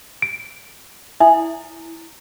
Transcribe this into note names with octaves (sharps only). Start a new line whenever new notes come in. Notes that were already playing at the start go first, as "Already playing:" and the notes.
D7
E4 E5 G#5